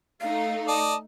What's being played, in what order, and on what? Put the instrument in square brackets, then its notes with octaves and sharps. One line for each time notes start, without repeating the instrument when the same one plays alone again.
[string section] A3 D#4 [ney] F5
[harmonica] D5 D#5 [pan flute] A5